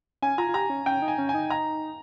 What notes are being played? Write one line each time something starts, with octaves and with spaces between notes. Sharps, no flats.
C#4 G#5
F4 A#5
F4
G4 A#5
C#4
C#4 G5
D#4
G#5
C#4
G#5
D#4
A#5